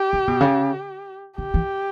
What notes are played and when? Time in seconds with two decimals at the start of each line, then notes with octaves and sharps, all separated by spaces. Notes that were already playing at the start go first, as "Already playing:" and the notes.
Already playing: G4
0.13 C#3
0.28 B2
0.41 C#3
1.38 D3 G4
1.54 E3